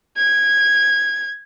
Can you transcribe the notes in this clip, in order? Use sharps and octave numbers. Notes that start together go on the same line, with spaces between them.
G#6